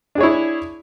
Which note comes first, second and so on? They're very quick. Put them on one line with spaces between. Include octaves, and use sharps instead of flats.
D4 G#4 C#5 E4